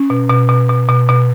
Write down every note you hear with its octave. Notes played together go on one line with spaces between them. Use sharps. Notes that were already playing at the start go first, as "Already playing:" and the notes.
Already playing: C#4
B2
B2
B2
B2
B2
B2